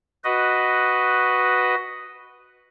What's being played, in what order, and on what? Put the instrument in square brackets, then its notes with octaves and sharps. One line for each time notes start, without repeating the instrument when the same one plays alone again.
[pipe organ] F#4 B4 D#5